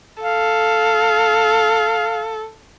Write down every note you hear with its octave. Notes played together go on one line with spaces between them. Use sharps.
A4 F5